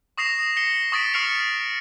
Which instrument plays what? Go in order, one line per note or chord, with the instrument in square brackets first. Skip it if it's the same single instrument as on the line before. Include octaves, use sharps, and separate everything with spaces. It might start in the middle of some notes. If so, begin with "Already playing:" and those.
[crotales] C#6 D#6 A#6 C7 E7 F7
A#6 C7 C#7 G7
C#6 D#6 A6 B6 D7
C#6 D#6 F6 C7 C#7 F7